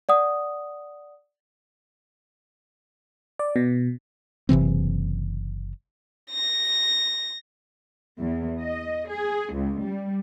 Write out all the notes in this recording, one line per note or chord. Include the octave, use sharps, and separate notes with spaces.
D5 F#5 D#6
D5
B2
F#1 C3 E3 C4
A#6
E2
D#5
G#4
C#2
G3